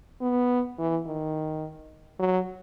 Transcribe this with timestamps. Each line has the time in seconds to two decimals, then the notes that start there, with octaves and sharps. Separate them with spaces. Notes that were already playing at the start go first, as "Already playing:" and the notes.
0.21 B3
0.78 E3
1.06 D#3
2.19 F#3